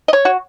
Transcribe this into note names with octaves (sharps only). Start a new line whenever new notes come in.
D#5
C#5
F#4